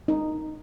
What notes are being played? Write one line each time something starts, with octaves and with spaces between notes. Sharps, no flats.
D#4